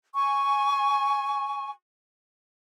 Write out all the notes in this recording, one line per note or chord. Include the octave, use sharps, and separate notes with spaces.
G#5 C#6